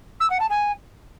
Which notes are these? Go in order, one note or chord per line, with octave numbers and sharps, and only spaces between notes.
E6
F#5
A5
G#5